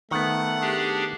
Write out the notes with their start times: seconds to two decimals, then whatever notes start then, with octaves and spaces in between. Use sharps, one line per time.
0.11 D#3 A3 B3 F#5
0.61 D4 G4 G#4